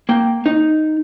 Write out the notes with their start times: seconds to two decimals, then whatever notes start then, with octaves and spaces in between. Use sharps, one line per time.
0.09 A#3 G5
0.46 D#4